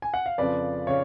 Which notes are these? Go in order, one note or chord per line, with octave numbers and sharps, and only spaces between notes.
G#5
F#5
F5
F2 C#3 F3 B4 D5
C#3 C#5 F5